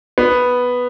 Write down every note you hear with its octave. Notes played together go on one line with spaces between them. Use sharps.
B3